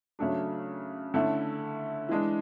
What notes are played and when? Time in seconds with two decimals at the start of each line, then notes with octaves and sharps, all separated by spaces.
0.19 C#3 F#3 A3 D4
1.14 D3 A3 C#4 E4
2.08 E3 G#3 D4